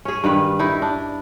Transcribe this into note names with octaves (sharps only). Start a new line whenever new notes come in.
C#4 G#4
G2 D#3 B4
D#4 E4
D4